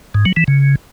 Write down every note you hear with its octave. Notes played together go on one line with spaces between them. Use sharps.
G#2
F#3
E3
C#3